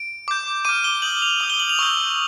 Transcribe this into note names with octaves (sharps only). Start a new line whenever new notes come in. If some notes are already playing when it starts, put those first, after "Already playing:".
Already playing: D7
D6 G6
D6 F6 D#7
G7
D#6 G6 F#7
F7
D#6 G6 F#7
G7
F#7
F7
C#6 E6 G6